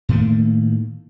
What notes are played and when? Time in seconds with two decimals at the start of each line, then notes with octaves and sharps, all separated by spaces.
0.09 A2 D#3 A3 A#3